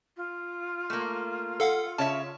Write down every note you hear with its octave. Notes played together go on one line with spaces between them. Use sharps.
F4
A3 A#3
A4 F5 F#5
C#3 C#5 E5 A5